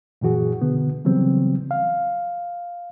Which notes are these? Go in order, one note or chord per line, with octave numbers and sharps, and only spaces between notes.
F#2 A#2 E3 F#4 G#4
B2 D3 B3
C#3 E3 F#3 G3 B3 C4
F5